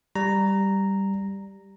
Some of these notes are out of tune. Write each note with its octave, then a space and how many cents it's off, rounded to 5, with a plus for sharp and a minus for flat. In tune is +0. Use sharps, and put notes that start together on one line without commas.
G3 +0 A#5 -5